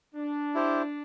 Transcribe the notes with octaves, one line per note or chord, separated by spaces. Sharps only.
D4
E4 G4 C5